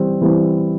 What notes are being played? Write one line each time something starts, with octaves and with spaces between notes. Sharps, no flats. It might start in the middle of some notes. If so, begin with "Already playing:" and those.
Already playing: E3 G3 C4
E3 G3 C4